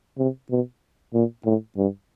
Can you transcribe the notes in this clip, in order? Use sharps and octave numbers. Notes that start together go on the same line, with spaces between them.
C3
B2
A#2
A2
G2